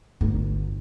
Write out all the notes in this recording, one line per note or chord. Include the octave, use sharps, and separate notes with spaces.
G1